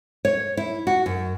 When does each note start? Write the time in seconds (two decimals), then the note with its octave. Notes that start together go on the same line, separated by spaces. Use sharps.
0.25 C#5
0.57 E4
0.87 F#4
1.06 F#2